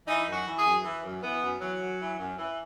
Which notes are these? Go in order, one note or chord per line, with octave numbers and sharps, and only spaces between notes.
E3 D#4
F#2
F#4
E3
G#4
F#2
E3
F#2
E3 B3
F#2
E3 F#3
F#2
E3
F#2
E3